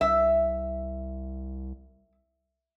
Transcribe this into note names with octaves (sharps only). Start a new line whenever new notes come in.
C2 E5